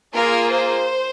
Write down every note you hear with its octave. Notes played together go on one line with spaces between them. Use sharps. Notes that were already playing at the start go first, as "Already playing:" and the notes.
A#3 F4 G#4 A#4
C5